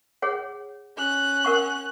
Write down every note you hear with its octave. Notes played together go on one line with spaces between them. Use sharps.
G#4 C#5 F#5
C#4 F#6
A#4 F#5 C#6